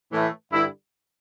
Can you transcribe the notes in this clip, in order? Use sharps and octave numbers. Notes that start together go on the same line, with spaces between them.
A2 E3 A3
G2 D3 G3 E4